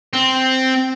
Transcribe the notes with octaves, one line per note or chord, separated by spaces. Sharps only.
C4